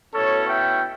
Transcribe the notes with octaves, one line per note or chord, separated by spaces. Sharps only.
B2 A3 C#4 E4 A4 C#5
E5 G5